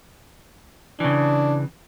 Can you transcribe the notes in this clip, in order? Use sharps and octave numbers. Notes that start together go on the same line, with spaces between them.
C#3 E3 D4